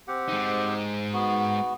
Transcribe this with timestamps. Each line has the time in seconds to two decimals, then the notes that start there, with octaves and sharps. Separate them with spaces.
0.08 C4 G4 F#5
0.28 G#3 D#4
1.13 B3 F#4